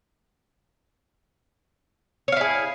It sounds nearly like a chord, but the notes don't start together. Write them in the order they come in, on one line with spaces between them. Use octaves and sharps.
C#5 F5 E4 G#4